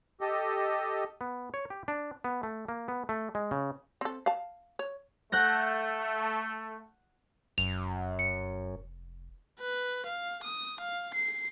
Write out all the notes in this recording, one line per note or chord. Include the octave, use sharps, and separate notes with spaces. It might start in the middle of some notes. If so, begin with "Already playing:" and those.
G4 A4 D#5
B3
C#5
G4
D4
B3
A3
A#3
B3
A3
G#3
C#3
C4 A4
F5 A5
C#5
A3 F#5 G6 A#6
F1 F#2 F7
C#7
B4
F5
D#6
F5
C7